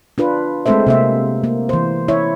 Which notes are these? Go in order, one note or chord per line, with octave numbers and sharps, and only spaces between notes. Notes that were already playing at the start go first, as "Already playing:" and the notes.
D4 F4 B4
G#3 A3 C4 A4 C5 E5
C3 A#3 E5
A#3
E3 C5
E4 C#5 E5